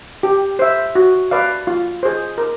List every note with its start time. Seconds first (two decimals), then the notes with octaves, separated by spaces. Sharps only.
0.23 G4
0.59 C5 E5
0.95 F#4
1.31 B4 D5 F5
1.67 F4
2.03 G#4 C5
2.38 A#4